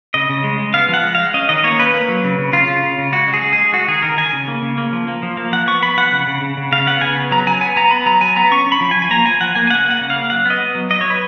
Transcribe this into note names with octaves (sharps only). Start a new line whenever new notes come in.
C#3 D#5
C#3
G#3
G#3
B3 F5
F3 F#5
G#3
G#3 F5
C#4 D#5
D#3 D#5
A#3 C#5
C#4 B4
A#3
F#3
C#3
C#3
C#3 F4
C#3
C#3
C#3
G#3 F#4
G#3
G#4
G#3
G#3 G#4
G#3 F#4
D#3 G#4
D#3 A#4
D#3 G#5
C#3
A#3
C#3
A#3
F3
A#3
F3
A#3
F3 F#5
B3 C#6
B3 B5
F3 F#5
C#3
C#3
C#3
C#3
C#3 F5
B3 F#5
C#3 G#5
B3
F#3 A#5
F#3 G#5
B3 G#5
B3 A#5
B3 B5
F#3 A#5
F#3 G#5
B3 A#5
C#4 C#6
C#4
B5
F3
G#5
F3
G#5
A#3 A#5
F3 G#5
F3 F#5
A#3 G#5
G#5
C#3 F#5
A#3
F#5
C#3
F5
A#3
F#3 F#5
B3 D#5
B3
F#3
F#3 D#5
F#3 C#5
B4